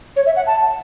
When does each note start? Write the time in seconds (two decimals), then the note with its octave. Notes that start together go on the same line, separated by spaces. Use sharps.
0.16 C#5
0.26 E5
0.36 F#5
0.47 A5